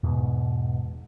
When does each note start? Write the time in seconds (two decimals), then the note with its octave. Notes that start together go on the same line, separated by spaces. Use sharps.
0.03 E2 G#2 B2